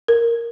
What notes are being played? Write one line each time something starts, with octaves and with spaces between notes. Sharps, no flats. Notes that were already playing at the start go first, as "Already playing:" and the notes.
A#4